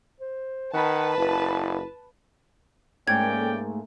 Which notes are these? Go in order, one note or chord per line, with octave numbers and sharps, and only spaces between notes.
C5
D#3 B4 F#5 A5
F#1 E4
G#2 A3 A#3 C#4 D5 G5 G#6